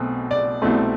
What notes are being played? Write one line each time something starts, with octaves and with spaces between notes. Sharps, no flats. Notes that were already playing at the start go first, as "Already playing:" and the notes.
Already playing: B1 B2 A3 C4
D5
C2 B2 A3 C4